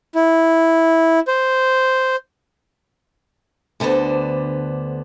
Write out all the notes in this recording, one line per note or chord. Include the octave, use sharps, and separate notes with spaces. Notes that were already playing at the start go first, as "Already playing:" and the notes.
E4
C5
D2 D3 B3 D4 C5